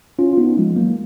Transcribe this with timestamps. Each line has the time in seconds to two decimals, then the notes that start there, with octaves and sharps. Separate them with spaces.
0.19 C#4 F4
0.33 F4
0.37 B3 D#4
0.57 F3 G#3
0.76 F#3 A#3